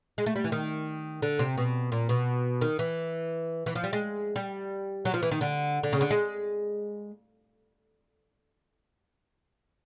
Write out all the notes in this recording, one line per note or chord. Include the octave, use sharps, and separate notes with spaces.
G#3
A3
G3
E3
D#3
D3
C3
B2
A#2
B2
D#3
E3
E3
F3
G3
G#3
G3
F#3
F3
E3
D#3
D3
D3
C#3
D3
G#3